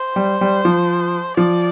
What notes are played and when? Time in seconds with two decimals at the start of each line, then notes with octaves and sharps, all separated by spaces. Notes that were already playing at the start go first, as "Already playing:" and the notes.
Already playing: C5
0.16 G3
0.41 G3
0.65 F3
1.37 F3 D5